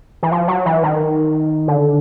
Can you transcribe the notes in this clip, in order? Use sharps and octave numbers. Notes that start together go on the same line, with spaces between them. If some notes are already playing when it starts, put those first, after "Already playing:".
E3
F3
F#3
E3
D#3
D3